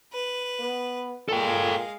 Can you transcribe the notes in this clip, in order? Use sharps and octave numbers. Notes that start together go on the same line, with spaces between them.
B4
B3
A#2 G#3 A4 F5 G5